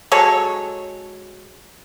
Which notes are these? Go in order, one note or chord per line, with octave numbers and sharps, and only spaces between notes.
F#3 G#3 A4 C#5